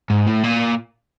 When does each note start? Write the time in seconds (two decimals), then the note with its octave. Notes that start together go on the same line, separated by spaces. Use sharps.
0.10 G#2
0.27 A2
0.43 A#2